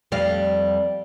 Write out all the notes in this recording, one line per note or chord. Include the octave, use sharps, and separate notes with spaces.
F2 G3 F5